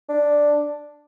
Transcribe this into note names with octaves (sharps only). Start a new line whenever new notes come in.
D4